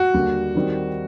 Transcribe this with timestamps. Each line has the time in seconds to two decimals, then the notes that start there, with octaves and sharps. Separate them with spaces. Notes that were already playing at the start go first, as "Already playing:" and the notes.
Already playing: F#4
0.14 D#2 D3 G3
0.55 D#3 G3 C4 D#4